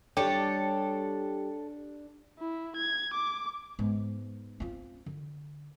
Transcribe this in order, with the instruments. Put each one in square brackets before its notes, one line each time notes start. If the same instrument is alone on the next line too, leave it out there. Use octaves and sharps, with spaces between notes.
[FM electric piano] G3 G4 [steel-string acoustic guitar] D4 [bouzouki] A4 C#5
[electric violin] E4
G#6
D6
[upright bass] G#2 B3
C4 F4
D3